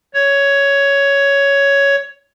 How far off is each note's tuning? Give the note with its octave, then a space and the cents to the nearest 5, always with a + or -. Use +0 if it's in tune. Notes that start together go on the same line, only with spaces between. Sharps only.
C#5 +10